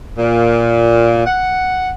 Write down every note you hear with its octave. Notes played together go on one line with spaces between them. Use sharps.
A#2
F#5